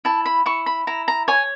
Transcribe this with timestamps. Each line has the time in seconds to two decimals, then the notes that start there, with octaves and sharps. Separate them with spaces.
0.05 E4 A5
0.26 B5
0.46 E4 C#6
0.66 B5
0.87 E4 A#5
1.08 A#5
1.28 C#5 G#5